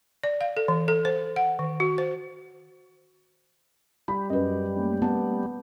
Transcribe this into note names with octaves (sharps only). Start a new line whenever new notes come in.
D5
F5
A4
E3
A4
C5
F#5
D#3
F#4
C5
G3 B5
F#2 F#4 B4 D#5
A3 A#3 C#4
B3 A5